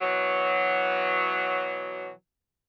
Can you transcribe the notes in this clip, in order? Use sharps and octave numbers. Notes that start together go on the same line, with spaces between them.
B2 E3 F#3